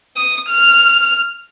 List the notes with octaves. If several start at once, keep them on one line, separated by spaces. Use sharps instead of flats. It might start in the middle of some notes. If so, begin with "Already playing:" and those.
D#6
F6